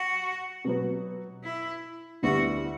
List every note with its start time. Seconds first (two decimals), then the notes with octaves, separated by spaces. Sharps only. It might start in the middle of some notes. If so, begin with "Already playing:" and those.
Already playing: F#4
0.64 B2 F#3 B3
1.44 E4
2.23 D2 D3 G3 B3 E4 F#4